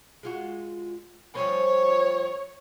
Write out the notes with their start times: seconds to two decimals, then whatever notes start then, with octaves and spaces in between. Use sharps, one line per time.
0.23 G#3 F4 F#4
1.35 F3 G3 C#4 C#5